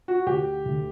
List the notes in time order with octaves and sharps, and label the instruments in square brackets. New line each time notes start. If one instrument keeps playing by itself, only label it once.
[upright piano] F#4
[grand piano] D2 [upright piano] G4
[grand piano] D2